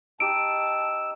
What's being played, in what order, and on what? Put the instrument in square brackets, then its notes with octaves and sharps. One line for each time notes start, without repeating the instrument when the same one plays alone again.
[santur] D#4 G4 [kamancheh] A5 [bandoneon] E6 [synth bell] D7